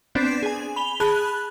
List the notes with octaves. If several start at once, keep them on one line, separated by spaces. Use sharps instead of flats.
B3 C4 D4 D5 E7
G#4 G#5
B5 F7 G7
G#4 A5 B5 F#6